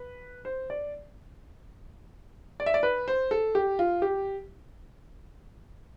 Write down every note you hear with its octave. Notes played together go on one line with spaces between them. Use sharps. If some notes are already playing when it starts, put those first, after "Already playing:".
Already playing: B4
C5
D5
D5
E5
D5
B4
C5
A4
G4
F4
G4